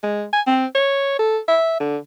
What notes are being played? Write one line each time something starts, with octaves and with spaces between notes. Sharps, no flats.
G#3
G#5
C4
C#5
A4
E5
D3